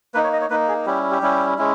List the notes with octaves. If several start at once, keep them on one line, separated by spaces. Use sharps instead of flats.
A#3 D#4 B4
C#5
D#5
C#5
A#3 D#4 B4
G#4
G3 C#4 E4 G4
G4
G3 C#4 E4
G#3 C#4 E4